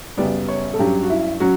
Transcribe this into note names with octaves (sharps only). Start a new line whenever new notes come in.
F#2 C#3 G3 B3 D5
C#5
A4
G2 F#3 C#4 G4
F#4
E4
F#3 C#4 F#4